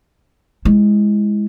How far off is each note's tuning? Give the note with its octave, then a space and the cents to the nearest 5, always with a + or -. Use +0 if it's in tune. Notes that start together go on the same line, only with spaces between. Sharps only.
G#3 +0 E4 +0